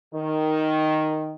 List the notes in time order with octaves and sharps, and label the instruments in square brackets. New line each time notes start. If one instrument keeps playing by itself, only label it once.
[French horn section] D#3